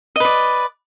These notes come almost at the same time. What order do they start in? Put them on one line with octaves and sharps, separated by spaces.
D#5 B4 D5